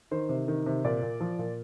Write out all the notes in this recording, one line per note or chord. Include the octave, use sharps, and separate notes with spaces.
D#3 C5
C3
D#3
C3
A#2 D5
A#2
F3
A#2